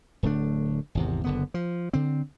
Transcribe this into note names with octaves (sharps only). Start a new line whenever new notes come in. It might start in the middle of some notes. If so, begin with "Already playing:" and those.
D1 D3 A3 D4
G#1 E2 C3
F#1 D3 B3
F3
D3 C4